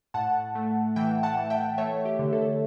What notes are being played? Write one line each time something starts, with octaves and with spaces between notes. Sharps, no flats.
A2 F#5 A5
A3
E3 E5 G5
F#5 A5
E3
E5 G5
A3 C#5 E5
G4
D3
A4